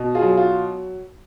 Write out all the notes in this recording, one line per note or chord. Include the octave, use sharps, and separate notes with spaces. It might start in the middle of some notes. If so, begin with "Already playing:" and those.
Already playing: B2
F4 G#4
F#3
F4